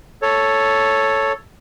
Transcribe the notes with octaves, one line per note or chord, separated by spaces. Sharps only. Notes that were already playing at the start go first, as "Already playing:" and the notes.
A4 C#5